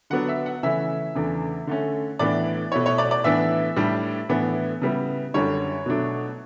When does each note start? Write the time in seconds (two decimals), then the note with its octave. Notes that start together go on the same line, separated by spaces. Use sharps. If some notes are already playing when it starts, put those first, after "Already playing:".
0.10 D3 F#3 B3 D4 F#5
0.28 E5
0.46 F#5
0.63 C#3 E3 A3 C#4 E4 E5
1.15 E2 C#3 E3 A3 D4
1.67 D3 A3 C#4
2.19 A2 E3 B3 D4 D5
2.72 B2 A3 E4 C#5
2.86 C#5
2.98 D5
3.11 D5
3.24 A2 E3 B3 D4 E5
3.76 A2 G3 D4
4.29 A2 E3 B3 D4
4.82 C#3 G3 B3 E4
5.34 F#2 D3 G3 D4 C#5
5.86 B2 F#3 A3 D4